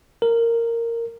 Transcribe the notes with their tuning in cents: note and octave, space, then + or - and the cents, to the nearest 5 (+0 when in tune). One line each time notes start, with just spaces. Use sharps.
A#4 -10